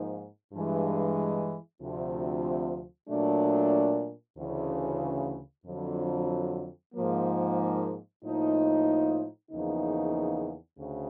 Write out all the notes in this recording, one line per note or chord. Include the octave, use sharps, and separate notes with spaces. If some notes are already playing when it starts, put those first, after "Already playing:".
Already playing: G#2 F3 A#3 D#4
G2 E3 G#3
D2 C3 F3
A#2 F#3 A3 D4
D2 C#3 E3
F2 D3 F#3
G#2 F3 A#3
A2 F3 A#3 D#4
E2 C#3 F3 A#3 D#4
D2 C#3